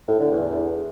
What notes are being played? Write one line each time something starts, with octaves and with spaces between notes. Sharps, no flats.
A2
D3
E2